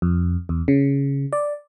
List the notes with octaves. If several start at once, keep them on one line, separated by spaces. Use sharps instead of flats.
F2
E2
C#3
D5